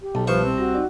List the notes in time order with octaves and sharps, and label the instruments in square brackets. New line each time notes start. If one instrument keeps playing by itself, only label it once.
[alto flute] G4
[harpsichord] B1 [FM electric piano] B2 A5
[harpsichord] C2 C5 C#6 [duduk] F3 [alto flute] B4
[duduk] C4
[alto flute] F#4 [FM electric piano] A#6
[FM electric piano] D#4 D5